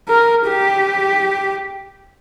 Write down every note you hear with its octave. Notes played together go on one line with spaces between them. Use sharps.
A#4
G4